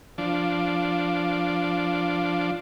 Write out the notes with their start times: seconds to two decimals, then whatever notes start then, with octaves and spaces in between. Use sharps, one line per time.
0.18 F3 D4